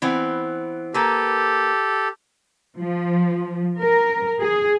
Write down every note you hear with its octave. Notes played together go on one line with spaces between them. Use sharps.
E3 B3 C4
A#3 G4 A4 B4
F3
A#4
G#4